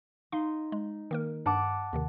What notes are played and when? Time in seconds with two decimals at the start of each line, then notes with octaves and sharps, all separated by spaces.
0.32 D#4 F5 C6
0.72 G#3
1.11 D#3 A#3 A#4
1.46 G2 F#5 A5 D6
1.93 D#2 C3 D#3